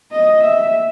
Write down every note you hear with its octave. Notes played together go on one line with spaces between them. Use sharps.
D#5
E5